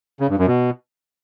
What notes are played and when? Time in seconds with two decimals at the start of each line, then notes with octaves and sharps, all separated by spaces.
0.20 C#3
0.29 G2
0.38 F#2
0.47 B2